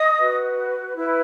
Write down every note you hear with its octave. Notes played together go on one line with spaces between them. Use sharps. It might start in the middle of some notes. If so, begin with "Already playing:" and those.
Already playing: D#5 D#6
F#4 B4
E4 B4